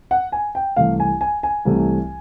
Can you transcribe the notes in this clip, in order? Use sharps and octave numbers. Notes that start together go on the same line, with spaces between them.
F#5
G#5
G5
C2 C3 E3 A3 F5
G#5
G#5
G#5
C2 C3 E3 A3